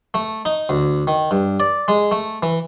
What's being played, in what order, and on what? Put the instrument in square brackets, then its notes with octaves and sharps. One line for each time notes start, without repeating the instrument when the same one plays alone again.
[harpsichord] A3
D#4
D2
D#3
G2
D5
G#3
A3
E3